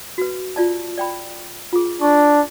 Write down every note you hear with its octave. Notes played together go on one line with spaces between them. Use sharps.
F#4 B4
F4 D5 A5
D5 G5 B5
F4 G#4
D4 C#6